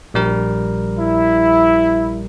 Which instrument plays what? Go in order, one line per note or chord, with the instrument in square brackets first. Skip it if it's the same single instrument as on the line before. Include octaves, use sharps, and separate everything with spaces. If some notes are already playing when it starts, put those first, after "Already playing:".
[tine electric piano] A#1 G3 A#4
[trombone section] E4